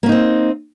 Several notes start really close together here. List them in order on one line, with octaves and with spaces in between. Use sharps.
A#3 C#4 D#4 C4